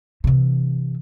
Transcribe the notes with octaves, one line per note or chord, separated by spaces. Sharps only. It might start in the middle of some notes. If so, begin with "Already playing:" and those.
C3 E3